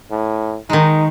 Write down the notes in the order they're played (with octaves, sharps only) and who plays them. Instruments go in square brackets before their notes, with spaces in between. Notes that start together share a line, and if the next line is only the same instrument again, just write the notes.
[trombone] A2
[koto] D#3 G#3 [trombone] D#4